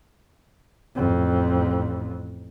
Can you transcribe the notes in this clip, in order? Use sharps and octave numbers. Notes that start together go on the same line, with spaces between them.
A1 F2